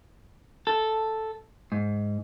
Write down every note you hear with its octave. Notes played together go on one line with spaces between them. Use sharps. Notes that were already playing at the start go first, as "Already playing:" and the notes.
A4
G#2